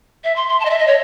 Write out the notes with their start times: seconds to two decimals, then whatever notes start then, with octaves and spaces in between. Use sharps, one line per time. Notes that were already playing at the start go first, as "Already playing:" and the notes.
0.24 E5
0.36 C6
0.49 C6
0.60 A5
0.65 D#5
0.70 E5
0.79 D#5
0.87 C#5